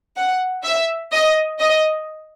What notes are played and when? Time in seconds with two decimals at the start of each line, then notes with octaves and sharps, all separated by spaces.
0.17 F#5
0.64 E5
1.12 D#5
1.60 D#5